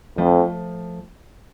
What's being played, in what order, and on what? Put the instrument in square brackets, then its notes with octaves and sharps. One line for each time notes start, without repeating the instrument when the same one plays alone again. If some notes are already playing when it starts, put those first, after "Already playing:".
[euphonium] F2 [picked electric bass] F3 A3